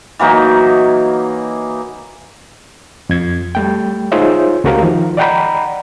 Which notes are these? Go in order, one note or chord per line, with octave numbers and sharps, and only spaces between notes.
E3 F#3 A#3 D#4
F2 G#6
G3 A3 G5
D#4 F4 G#4 C5 C#5 E5
C#2 A3 F#4 G4 A#4 F5
D#3 F3
D5 D#5 F#5 G5 A#5 B5